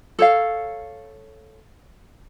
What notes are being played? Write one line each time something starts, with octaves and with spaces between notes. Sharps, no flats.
A4 C#5 F5